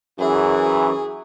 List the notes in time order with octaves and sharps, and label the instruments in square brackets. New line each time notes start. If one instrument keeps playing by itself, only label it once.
[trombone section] F#2 E3 [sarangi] G#4